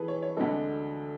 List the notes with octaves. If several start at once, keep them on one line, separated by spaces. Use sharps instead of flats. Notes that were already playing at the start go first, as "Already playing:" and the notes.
Already playing: E3 G#4 A4 B4
C#5
C#5
D2 D3 G#3 A4